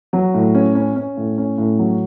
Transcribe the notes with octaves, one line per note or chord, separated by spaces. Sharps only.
F#3
A2
C#4
C#4
C#4
A2
C#4
A2
F#3